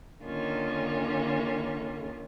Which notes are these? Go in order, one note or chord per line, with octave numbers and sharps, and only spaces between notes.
D3 D#3 A#3 C#4 F4